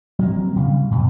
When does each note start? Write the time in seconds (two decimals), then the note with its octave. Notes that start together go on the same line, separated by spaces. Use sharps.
0.19 F#3 A#3 C4
0.56 C#3 G3
0.91 F2 B2